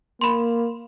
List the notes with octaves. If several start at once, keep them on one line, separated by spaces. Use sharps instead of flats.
A#3 B5 C6